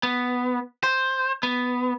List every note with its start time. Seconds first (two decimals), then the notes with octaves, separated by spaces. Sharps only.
0.03 B3
0.83 C5
1.43 B3